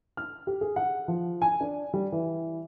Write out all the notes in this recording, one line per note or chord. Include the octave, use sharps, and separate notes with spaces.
F6
G4
G#4
F#5
F3
G#5
D4
G3
E3